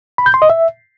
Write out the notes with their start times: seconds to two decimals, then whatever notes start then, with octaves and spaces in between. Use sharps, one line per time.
0.18 B5
0.26 G6
0.34 C6
0.42 D#5
0.50 E5